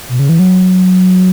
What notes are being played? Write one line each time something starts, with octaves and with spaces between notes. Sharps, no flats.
B2
C#3
E3
F#3